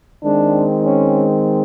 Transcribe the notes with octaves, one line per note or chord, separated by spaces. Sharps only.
D#3 G#3 C4 D4
C#4